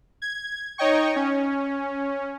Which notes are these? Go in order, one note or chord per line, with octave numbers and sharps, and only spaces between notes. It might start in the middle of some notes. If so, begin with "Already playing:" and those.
G#6
D#4 C#5 D#5 G5 C#6
C#4